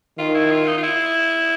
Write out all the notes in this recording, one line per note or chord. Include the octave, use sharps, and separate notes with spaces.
D#3 F4
E4
F4
D#4
F4
E4